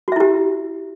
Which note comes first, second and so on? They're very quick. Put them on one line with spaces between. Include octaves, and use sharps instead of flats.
F#4 E5 E4 G4